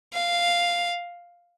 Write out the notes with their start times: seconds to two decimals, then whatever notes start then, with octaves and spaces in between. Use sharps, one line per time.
0.13 F5